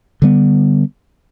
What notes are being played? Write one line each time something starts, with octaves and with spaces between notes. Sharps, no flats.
D3 G3 B3